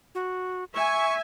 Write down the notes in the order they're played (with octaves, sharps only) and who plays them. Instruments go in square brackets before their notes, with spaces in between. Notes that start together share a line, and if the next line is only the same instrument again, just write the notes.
[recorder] F#4
[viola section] E5 G#5 [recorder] C#6